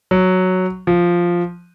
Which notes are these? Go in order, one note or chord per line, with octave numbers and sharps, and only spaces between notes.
F#3
F3